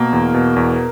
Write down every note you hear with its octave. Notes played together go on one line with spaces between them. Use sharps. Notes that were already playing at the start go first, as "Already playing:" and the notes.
Already playing: B2 A#3
E2
B2
E2